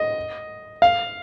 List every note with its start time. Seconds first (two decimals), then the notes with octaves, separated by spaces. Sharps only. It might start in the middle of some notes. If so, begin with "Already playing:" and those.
Already playing: D#5
0.82 F5